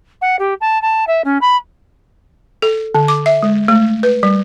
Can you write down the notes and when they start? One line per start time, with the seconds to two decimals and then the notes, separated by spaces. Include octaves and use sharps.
0.21 F#5
0.39 G4
0.61 A5
0.82 A5
1.07 E5
1.24 C#4
1.41 B5
2.62 A4
2.95 D3
3.08 D6
3.26 E5
3.43 G#3
3.68 A3
4.03 B4
4.23 G3